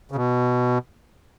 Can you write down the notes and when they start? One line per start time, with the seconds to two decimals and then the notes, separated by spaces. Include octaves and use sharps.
0.11 C#3
0.16 B2